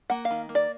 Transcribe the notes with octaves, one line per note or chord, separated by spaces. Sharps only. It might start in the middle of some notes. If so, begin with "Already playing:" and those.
A#3 F#5
F5
D#3
A#3
D5